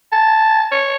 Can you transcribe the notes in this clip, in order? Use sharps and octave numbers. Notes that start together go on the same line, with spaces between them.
A5
C#5